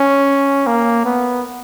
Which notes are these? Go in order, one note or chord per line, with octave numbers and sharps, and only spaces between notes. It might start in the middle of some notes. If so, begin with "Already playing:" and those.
Already playing: C#4
A#3
B3